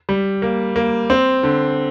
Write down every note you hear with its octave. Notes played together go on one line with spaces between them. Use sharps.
G3
A#3
A#3
C4
D3